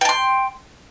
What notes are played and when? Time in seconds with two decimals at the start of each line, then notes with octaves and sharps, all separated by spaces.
0.01 G5
0.05 A5
0.09 C6